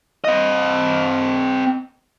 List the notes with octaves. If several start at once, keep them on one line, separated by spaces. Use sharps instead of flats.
C4 D#5